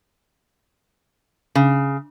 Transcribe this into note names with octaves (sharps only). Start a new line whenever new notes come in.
C#3